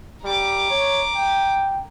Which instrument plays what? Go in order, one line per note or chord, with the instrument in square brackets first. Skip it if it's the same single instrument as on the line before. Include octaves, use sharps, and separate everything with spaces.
[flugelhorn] G3 [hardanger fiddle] A#5 D6
[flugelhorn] C#5
G5